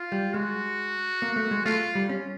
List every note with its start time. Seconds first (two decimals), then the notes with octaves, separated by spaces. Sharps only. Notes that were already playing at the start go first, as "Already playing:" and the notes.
Already playing: F4
0.12 G3
0.34 G#3 F#4
1.22 A#3
1.36 A3
1.51 G#3
1.65 A3 F4
1.95 G3
2.09 C#4